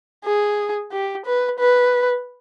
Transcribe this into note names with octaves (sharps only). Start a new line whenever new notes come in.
G#4
G4
B4
B4